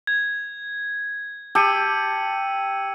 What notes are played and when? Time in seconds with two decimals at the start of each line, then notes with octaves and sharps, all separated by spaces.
0.07 G#6
1.55 G4 A5 E6 C#7 D#7